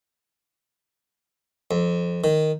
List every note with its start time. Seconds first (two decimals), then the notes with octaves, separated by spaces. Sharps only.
1.71 F2
2.24 D#3